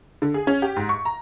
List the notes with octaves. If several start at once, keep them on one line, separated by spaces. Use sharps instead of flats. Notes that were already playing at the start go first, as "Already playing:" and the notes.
D3
G#4
C#4
G4
G#2
C#6
A#5